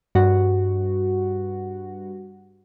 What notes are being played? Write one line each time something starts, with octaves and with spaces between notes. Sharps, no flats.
G2 F#4